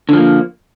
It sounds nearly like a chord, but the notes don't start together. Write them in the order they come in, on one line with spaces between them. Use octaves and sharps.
D3 F3 A#3